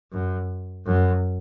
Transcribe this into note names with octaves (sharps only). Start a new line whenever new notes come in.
F#2
F#2